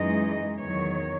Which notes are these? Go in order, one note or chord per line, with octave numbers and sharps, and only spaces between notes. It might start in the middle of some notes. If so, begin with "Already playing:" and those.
Already playing: F#2 E3 G#3 D#4 D#5
E2 D#3 F#3 C#5